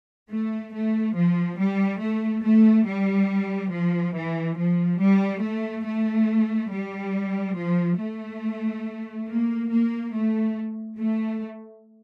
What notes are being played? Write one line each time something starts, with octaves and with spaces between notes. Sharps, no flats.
A3
A3
F3
G3
A3
A3
G3
F3
E3
F3
G3
A3
A3
G3
F3
A3
A#3
A#3
A3
A3